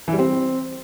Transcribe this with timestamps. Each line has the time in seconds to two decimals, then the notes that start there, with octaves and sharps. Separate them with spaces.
0.08 E3
0.13 G3
0.18 C4